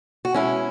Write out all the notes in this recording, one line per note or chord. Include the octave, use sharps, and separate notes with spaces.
F#4
B2 G#3 C#4 E4